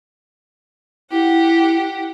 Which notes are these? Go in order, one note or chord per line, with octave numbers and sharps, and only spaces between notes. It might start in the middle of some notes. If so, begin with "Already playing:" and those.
E4 G4 F#5